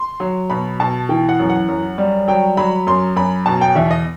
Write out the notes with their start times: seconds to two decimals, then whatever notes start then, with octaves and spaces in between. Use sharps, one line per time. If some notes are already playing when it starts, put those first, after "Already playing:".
Already playing: C6
0.20 F#3
0.50 B2 B5
0.80 B2 A5
1.09 E3 G5
1.29 F#5
1.39 F#2
1.50 F#5
1.68 F#2
1.98 G3
2.28 F#3 G5
2.57 F#3 B5
2.87 F#2 C6
3.16 F#2 B5
3.46 B2 A5
3.61 G5
3.76 E2 E5
3.91 D#5